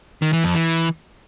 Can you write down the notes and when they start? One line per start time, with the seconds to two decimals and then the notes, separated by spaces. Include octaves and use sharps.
0.22 D#3
0.33 E3
0.44 F2
0.55 E3